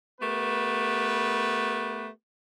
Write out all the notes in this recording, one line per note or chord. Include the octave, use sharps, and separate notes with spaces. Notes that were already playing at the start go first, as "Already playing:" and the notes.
A3 B3 G4 A#4 B4